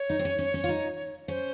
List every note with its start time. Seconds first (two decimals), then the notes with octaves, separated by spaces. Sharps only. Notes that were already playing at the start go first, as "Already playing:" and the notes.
Already playing: C#5
0.10 D#4
0.19 C4
0.25 C#4
0.39 C#4
0.54 C#4
0.64 F4
0.69 D#4
1.28 C#4 C5